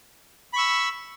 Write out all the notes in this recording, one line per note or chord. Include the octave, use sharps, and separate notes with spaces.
B5 C#6 E6